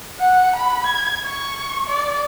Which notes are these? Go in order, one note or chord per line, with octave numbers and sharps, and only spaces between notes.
F#5
B5
G#6
C#6
D5